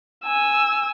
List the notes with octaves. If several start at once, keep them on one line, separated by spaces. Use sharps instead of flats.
G#5 E6